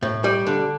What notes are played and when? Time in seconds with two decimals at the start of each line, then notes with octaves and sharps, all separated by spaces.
0.02 A2
0.24 G3
0.47 D3